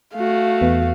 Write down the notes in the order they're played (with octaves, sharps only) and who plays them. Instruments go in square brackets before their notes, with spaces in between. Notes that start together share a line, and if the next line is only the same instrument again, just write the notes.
[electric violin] A3 F#4 [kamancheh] F5
[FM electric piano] E2 B3